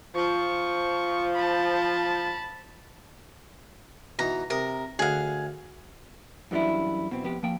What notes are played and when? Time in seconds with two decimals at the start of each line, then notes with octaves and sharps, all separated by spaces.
0.15 F3 C#6
1.36 A5 B5
4.19 B2 E3 D#4 A#5
4.50 C3 A#4 D#6
4.99 D2 G#4 F5 F#5
6.51 F#2 E3 G3 D4 E4
7.11 B2 C4
7.23 F2 B3 G4
7.43 F3 A#3 G5